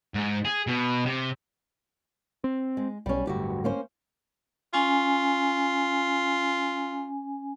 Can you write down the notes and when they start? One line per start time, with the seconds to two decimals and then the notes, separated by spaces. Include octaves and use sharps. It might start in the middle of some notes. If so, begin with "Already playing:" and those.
0.14 G#2
0.45 G#4
0.67 B2
1.06 C3
2.44 C4
2.77 G#3
3.06 B1 G3 C#4
3.27 D1 D2 G2 F#4 G4
3.64 A#3 C#4 C5
4.74 C#4 F4 G#5